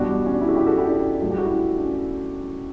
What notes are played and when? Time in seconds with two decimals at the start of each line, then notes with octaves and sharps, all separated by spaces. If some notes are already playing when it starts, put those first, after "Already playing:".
Already playing: E2 B2 G3 D4 F#4
0.26 C#4
0.34 D4
0.41 E4
0.49 F#4
0.56 E4 G4
0.67 F#4 A4
0.78 E4 G4
0.89 D4 F#4
1.21 G2 F#3 A3
1.31 G4
1.38 F#4
1.46 E4
1.53 D4
1.78 D4
1.85 C#4